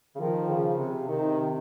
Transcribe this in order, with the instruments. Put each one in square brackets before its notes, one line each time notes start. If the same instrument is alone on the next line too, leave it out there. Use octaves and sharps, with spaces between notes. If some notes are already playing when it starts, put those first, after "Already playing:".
[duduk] C#3
[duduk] D#3 [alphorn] F3
[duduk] C#3
C3
[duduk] C3 [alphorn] D#3